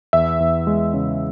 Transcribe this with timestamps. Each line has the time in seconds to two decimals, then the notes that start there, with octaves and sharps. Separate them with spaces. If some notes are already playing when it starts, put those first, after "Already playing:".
0.13 E2 E5
0.40 E2
0.67 G#3
0.94 C#3